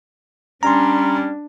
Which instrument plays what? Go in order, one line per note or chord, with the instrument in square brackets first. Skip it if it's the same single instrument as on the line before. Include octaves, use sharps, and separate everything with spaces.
[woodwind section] G3 C#4 [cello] D4 [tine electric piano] A#5 C6